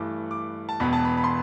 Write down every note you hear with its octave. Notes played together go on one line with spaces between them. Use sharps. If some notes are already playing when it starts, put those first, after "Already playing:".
Already playing: G2 E3 A3 D6
D6
A5
E1 E2 B2 B3 B5
A5
B5
B5
C6